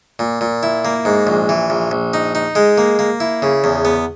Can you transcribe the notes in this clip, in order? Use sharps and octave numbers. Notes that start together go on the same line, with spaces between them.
A#2
A#2
E4
A#3
G#2
A#1
E3
A#1
A#1
D#4
D#4
G#3
A#3
A#3
E4
C#3
E2
B3